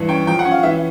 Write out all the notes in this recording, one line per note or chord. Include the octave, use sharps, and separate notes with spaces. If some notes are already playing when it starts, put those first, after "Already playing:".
Already playing: G2 E3
C#4 G5
F3 G5
F#5
C#4
F5
E3 E5